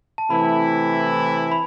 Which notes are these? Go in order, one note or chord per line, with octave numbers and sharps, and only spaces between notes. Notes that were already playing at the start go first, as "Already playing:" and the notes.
A5
C3 E3 A3 E4 B5
B5